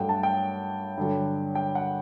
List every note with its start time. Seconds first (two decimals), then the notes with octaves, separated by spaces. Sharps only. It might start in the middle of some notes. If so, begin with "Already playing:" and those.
Already playing: G2 F#3 A3 F#5 G5
0.09 A5
0.23 G5
0.97 G2 D3 F#3
1.55 G5
1.75 F#5